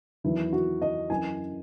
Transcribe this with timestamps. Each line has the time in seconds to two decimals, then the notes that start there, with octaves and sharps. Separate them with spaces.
0.24 E2 D#3 F#3 E4
0.53 F#4
0.82 D#5
1.10 F#2 E3 G#5